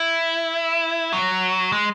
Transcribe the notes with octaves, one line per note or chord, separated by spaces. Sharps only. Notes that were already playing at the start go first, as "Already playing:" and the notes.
Already playing: E4
F#3
G#3